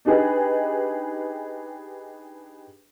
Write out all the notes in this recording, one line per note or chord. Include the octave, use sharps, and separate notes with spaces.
D4 D#4 G4 G#4 B4